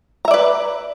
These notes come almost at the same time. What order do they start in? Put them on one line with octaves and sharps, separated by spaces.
A#5 E5 D5 B4